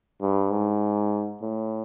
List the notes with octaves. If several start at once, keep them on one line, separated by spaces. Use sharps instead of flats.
G2
G#2
A2